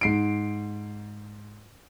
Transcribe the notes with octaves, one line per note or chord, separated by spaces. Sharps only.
G#2 C7 D7